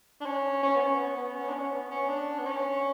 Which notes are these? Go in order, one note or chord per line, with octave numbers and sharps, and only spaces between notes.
D4
C#4
C#4
B3
C#4
B3
B3
C#4
D4
C#4
B3
C#4
D4
B3
C#4